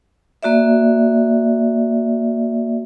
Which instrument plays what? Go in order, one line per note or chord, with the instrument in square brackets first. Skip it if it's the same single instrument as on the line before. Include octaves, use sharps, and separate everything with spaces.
[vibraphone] A#3 F#4 D5 E5